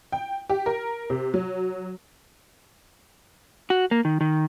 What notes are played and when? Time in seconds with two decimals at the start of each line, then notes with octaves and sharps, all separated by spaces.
0.12 G5
0.50 G4
0.66 A#4
1.10 C3
1.34 F#3
3.70 F#4
3.91 A#3
4.05 D#3
4.21 D#3